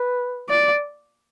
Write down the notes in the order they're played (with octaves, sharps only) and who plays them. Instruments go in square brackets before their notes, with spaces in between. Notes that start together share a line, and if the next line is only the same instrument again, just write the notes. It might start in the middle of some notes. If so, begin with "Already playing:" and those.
Already playing: [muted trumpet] B4
[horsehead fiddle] D5